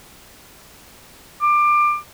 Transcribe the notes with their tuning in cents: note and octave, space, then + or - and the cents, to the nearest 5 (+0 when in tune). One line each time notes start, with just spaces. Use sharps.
D6 +20